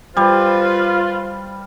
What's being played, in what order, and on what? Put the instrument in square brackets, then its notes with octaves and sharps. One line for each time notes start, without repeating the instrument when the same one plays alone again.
[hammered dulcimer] G3 [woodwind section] F4 [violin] B4 C5